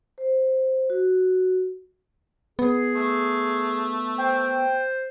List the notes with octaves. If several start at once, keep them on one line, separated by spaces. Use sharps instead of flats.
C5
F#4
B3 G#4
A3
C5 G5